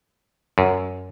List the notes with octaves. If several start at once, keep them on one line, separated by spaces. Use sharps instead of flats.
F#2